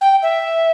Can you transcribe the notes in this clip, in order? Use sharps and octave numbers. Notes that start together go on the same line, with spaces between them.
G5
E5